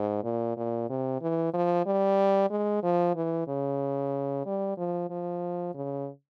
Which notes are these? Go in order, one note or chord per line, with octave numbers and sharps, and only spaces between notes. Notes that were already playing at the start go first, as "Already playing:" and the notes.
Already playing: G#2
A#2
A#2
C3
E3
F3
G3
G#3
F3
E3
C#3
G3
F3
F3
C#3